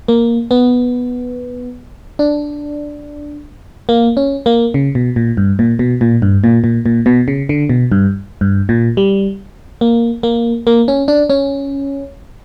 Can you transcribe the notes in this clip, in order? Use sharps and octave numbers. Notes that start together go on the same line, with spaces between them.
A#3
B3
D4
A#3
C#4
A#3
C#3
B2
A#2
G2
A#2
B2
A#2
G2
A#2
A#2
A#2
B2
C#3
D3
B2
G2
G2
A#2
G3
A#3
A#3
A#3
C#4
D4
C#4